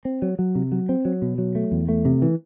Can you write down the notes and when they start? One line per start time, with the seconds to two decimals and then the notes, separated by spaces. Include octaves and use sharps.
0.05 C4
0.22 F#3
0.39 F#3
0.55 C3
0.72 F#3
0.89 C4
1.05 F#3
1.22 B2
1.38 F#3
1.55 A3
1.72 E2
1.89 A3
2.05 C3
2.22 E3